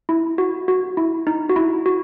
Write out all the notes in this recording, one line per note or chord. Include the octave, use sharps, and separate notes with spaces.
E4
F#4
F#4
E4
D#4
F#4
E4
F#4